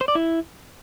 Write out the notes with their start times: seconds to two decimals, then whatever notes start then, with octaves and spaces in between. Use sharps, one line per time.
0.01 C5
0.08 D5
0.15 E4